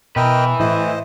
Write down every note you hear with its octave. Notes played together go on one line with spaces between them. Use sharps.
B2 A#4 B4 D#5 E5 G5
A2 E3 C5 D#5